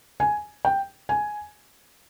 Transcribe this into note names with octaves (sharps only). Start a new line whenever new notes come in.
G#5
G5
G#5